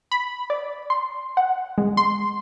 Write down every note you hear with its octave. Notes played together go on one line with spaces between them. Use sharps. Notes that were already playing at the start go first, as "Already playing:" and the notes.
B5
D5
C6
F#5
G#3
C6